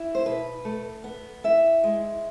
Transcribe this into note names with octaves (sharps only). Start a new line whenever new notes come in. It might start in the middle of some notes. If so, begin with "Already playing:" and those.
Already playing: E4
C5
B2 B4
A3
B3
E4 E5
G#3